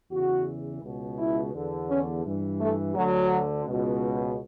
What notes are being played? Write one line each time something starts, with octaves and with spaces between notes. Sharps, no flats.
E2 C#3 E3 F#4
C#2 B2
E4
E2 D3
C#4
G2 E3
A3
D2 D3 F#3
C#2 B2